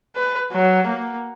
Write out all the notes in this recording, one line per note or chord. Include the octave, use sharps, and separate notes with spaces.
B4
F#3
A#3